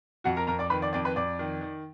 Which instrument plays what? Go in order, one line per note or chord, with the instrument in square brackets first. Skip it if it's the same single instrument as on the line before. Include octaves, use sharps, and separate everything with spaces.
[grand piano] F2 F#4 F#5
A#4 A#5
F2 A#4 A#5
D5 D6
D#3 B4 B5
D5 D6
F2 D5 D6
B4 B5
F2 D5 D6
D#3
D#3